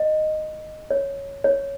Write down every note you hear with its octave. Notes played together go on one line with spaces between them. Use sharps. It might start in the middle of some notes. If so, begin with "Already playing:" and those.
Already playing: D#5
C#5
C#5